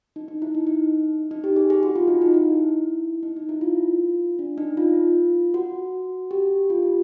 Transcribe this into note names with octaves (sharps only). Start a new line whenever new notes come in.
D#4
D#4
E4
D#4
D#4
D#4
G4
G#4
G#4
F#4
F4
D#4
D#4
E4
D#4
D#4
E4
F4
D4
D#4
F4
F#4
G4
F4
G4